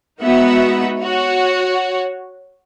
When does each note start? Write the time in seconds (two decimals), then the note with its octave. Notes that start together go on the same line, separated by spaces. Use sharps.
0.21 G#3 B3 D#4 F#4 E5 F#5
1.00 F#4 C#5